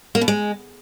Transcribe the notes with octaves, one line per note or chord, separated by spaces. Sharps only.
A#3
B2
G#3